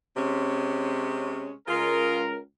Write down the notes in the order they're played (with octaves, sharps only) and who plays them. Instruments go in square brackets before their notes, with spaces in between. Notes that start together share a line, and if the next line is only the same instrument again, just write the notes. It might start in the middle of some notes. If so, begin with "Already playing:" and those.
[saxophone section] C3 G#3 C#4
[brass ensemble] C#2 A#4 [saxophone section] F4 G#4